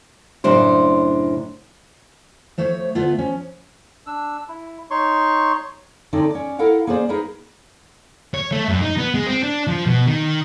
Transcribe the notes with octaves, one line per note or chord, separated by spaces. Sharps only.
F#2 A2 C#3 D4 C5
F3 A3 C5 C#5
D2 A3 B3 F4
F3 C#4
D4 E6
E4
D#4 C#5 C6 C#6
D3 A3 C4 C#4 D#4 D5
C#4 D5
E4 A4 A#4 F5 F#5
A#3 C#4 G#4 C5 D5
D#4 G#4 A#4 B4
C#5
A3
F#2
D#4
B3
G#3
C4
D4
F3
B2
D#3